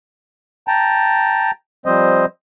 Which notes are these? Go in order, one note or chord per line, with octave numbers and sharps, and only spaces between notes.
G5 A5 A#5
F3 G3 C4 C5 D#5